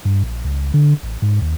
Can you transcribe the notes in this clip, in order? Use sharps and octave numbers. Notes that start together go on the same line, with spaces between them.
G2
A#1
C#2
D3
A1
G#2
D#2